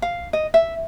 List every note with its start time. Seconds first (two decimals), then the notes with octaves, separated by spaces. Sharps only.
0.02 F5
0.33 D#5
0.54 E5